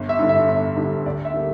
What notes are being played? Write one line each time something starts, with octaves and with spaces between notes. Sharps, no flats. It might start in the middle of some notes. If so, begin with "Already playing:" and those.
Already playing: G1
E5
G2 D3
E5
G1
G2 D3
D2 D5
E5
D3 G3 A#3